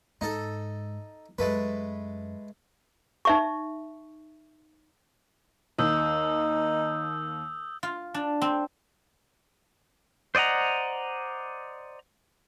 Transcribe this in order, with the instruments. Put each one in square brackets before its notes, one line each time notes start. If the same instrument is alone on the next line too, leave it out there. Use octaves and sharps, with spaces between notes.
[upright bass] G#2 [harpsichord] D#4 A4
[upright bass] F#2 [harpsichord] G#3 A3 B4
[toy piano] D#4 E5 C#6
[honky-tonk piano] D#2 [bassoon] D#4 [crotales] D#6 E6 G6
[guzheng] F4
D4
C4
[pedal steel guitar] C5 D5 D#5 F#5 A#5